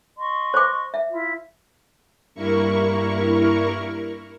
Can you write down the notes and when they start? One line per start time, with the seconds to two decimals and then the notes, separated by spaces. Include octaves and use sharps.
0.17 D#5 C6 C#6
0.54 C5 D6
0.94 E5
1.09 E4 F4
2.35 G2 A#3 E4 A#4 C#6